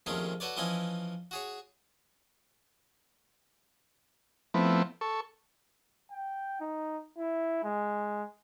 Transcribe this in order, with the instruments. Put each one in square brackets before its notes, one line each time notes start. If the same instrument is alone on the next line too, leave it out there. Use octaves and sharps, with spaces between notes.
[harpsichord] A#1 C3 D#3 A3 C#4 G#4
F#4 A4 B4 C#5 D5
E3 F3 C#4 E4 D#5 G#5
F#4 G#4 C#5
[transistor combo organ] F3 A3 B3 C4 E4
A4 C#6
[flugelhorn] G5
D#4
E4
G#3